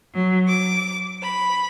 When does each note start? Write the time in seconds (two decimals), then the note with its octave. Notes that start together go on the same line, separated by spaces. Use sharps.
0.14 F#3
0.49 D6
1.22 B5